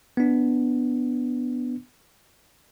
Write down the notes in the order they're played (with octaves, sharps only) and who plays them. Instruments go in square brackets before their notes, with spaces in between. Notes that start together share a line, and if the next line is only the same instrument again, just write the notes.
[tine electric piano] B3 D4